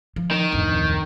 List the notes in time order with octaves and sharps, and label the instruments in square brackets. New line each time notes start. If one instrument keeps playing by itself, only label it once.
[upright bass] F3
[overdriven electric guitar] D#3
[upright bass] D1 F2